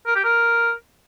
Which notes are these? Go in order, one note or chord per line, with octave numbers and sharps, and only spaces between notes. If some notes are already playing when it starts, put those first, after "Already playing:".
A#4
G4
A#4